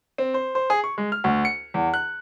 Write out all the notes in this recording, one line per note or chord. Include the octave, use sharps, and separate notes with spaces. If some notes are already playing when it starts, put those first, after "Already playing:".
C4
C5
C5
G#4
C#6
G#3
F6
D2
C#7
E2
F#6